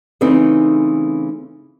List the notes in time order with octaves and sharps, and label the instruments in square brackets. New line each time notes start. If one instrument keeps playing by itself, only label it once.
[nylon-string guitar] C#3 E3 A3 C4 D#4